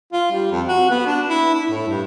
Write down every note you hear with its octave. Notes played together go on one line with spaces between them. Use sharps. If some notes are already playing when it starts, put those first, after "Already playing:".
F4
G3
F2
F#4
B3
D4
E4
E4
A2
G2